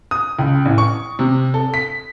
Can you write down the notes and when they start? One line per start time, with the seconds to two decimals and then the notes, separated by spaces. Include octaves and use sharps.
0.11 D#6
0.39 C#2
0.65 A1
0.78 C#6
1.19 C3
1.54 A4
1.74 B6